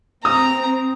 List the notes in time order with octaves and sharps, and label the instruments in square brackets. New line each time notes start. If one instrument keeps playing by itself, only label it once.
[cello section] C4 [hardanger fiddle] A#5 [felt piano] D#6